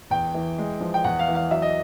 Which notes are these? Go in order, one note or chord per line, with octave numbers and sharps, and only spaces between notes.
E2 G5
E3
G#3
F3
G5
E2 F#5
F5
E3
F5
F#3 E5
D#5